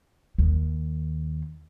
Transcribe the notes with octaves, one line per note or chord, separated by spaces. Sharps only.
D#2